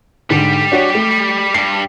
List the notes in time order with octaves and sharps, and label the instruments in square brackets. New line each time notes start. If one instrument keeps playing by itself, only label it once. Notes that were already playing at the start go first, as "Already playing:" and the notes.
[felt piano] G#2 D3 [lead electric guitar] G3 G4
[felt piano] D4 F#4 C#5
A3
[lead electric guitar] G2 G3 [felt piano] C7